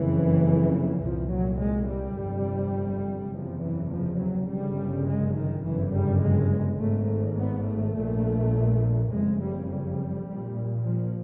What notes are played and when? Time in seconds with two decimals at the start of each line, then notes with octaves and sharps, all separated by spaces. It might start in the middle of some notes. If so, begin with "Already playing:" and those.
Already playing: F#1 F2 C#3 E3
1.01 C2 A#2 F3
1.31 F#3
1.60 G#3
1.89 G3
2.17 G1 F2 C3
3.32 F#1 E2 C3 F3
3.62 E3
3.91 F3
4.20 F#3
4.48 G1 F#2 C#3 G3
5.06 G#3
5.35 D#3
5.64 G1 F#2 C#3 E3
5.93 G3
6.22 G#3
6.79 G#1 G#2 A3
7.37 B3
7.66 A3
7.95 A#1 A#2
9.10 F#1 F2 C#3 G#3
9.39 G3
9.68 G3
10.26 A#1 A#2
10.84 F3